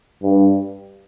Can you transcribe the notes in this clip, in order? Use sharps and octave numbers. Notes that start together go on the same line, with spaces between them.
G2